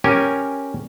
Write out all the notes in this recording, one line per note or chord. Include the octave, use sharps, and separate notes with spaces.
C#4 G4 A#4 G#5